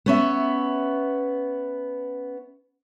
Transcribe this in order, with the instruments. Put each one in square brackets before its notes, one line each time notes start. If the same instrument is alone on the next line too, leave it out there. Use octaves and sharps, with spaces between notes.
[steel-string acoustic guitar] B3 C#4 E5